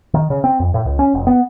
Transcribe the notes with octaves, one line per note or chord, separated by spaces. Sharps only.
D#3
C#3
C4
F2
A2
C#2
C#4
F1
B3